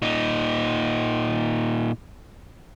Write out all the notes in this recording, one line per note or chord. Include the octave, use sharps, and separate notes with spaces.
A#2 D#4